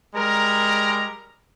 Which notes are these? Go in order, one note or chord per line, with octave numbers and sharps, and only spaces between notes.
G3 G#3 A#4 A#5